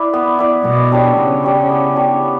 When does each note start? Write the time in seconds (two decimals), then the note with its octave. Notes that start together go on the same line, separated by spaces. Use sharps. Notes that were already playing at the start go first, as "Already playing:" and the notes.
Already playing: E4 B4 D5
0.13 B3
0.38 E4 B4 D5
0.65 B2 B3
0.92 D4 G4 C#5
1.17 C#3 B3
1.44 D4 G4 C#5
1.69 B3
1.96 D4 G4 C#5
2.23 B3